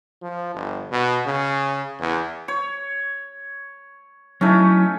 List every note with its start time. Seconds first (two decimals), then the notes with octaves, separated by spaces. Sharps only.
0.22 F3
0.55 G1
0.92 B2
1.26 C#3
2.00 E2
2.48 C#5
4.41 F#3 A3 C#4 D#4 E4